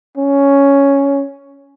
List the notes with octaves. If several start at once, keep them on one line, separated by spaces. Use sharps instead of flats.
C#4